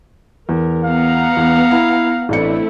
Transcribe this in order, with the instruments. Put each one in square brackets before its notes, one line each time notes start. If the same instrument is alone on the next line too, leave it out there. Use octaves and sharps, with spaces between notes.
[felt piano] E2 [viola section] A#4
[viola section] B3 F#5 A#5 [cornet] F5
[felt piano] E2
E4
[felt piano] A1 D4 C#7 [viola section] A3 C4 E4